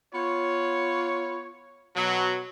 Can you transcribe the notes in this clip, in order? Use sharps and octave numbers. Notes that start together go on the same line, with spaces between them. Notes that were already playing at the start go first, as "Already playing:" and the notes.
B3 F4 C#5
B2 F#3